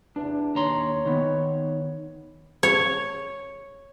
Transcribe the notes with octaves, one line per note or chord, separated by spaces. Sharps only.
E2 C3 D4
D#2 C#5 A#5 C6
D#3 B3
C#5